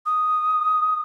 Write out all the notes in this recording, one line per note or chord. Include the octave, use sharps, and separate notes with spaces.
D#6